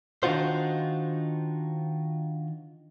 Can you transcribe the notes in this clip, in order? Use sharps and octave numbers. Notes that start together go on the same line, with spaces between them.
D#3 D4 D#4 F4 F#4 C5